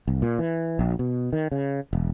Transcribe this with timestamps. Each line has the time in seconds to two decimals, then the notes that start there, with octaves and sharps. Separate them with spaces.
0.08 C2
0.22 A#2
0.39 E3
0.79 A#1
0.99 B2
1.33 D#3
1.52 C#3
1.93 E1